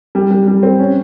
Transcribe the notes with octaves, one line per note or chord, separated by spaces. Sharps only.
G3
G3
G3
C4
C#4